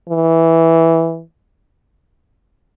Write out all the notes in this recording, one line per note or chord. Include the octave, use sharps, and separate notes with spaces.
E3